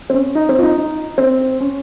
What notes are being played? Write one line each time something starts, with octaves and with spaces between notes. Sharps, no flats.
C4
C#4
D#4
C4
F4
D#4
D#4
C4
C#4